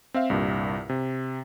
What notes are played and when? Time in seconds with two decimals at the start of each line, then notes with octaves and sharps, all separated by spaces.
0.14 C4 E5 F5
0.30 C2 G2 A#2
0.89 C3